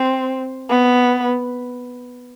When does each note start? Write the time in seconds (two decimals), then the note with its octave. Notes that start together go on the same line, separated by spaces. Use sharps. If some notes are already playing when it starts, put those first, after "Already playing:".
Already playing: C4
0.69 B3